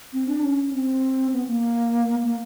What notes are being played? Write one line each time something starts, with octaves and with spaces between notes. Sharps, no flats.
C4
D4
C#4
C4
B3
A#3
A#3